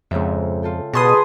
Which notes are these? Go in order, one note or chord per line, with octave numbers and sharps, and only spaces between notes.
F2 G#2 C#3 E5
F4 A4 G5
B2 G#4 B4 A5 C6 D#6